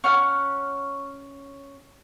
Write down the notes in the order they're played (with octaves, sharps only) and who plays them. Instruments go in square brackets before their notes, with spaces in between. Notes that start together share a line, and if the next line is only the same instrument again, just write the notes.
[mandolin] C#4 F#5 F6